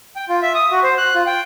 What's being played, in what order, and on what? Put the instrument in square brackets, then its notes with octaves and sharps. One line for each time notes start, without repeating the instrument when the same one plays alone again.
[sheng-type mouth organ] G5
F4
E5
D#6
F#4
C5
F#6
F4
G5